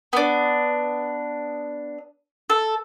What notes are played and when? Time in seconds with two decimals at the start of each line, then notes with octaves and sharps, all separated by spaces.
0.13 B3 D4
2.50 A4